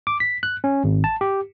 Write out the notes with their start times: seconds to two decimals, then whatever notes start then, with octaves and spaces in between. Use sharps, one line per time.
0.07 D6
0.20 B6
0.43 F#6
0.64 C#4
0.84 G#1
1.04 A5
1.21 G4